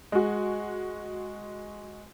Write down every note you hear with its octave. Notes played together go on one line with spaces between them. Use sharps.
G#3 F#4